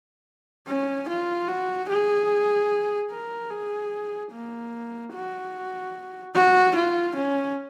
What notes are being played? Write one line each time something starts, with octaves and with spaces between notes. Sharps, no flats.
C#4
F4
F#4
G#4
A#4
G#4
A#3
F#4
F#4
F4
C#4